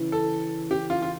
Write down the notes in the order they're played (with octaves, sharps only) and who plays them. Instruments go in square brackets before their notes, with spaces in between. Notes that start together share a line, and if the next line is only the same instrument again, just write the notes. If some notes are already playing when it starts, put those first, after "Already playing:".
Already playing: [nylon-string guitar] C#3 E3
[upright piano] A4
G4
F4
F4